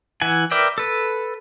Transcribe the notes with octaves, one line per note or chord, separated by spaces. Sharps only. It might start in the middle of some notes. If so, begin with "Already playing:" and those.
E3 E4 F#5 G#5
A#4 B4 D5 E5 G5
A4 B4